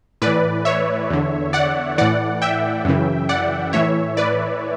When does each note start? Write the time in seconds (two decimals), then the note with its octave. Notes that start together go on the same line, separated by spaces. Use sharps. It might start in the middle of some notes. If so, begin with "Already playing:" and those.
0.22 A2 E3 B4 D5
0.65 C#5 E5
1.10 E2 D3
1.53 D5 F#5
1.98 A2 E3 D5 F#5
2.42 E5 G5
2.85 F#2 C#3 E3
3.29 D5 F#5
3.73 A2 E3 C#5 E5
4.17 B4 D5